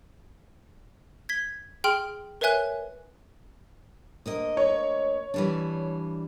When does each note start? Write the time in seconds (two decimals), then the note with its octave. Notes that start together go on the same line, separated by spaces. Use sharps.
1.29 G#6 B6 G7
1.84 G#4 G5 C6 F6 D7 F#7
2.41 A#4 B4 C#5 E5 G#5 F#6
4.26 D2 A#3 D#5
4.57 C#5
5.34 E3 G3 D4